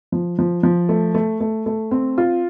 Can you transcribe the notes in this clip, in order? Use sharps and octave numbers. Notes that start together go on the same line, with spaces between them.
F3
F3
F3
A3
A3
A3
A3
C4
F4